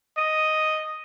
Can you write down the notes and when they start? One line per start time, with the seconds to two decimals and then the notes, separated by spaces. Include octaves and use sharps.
0.17 D#5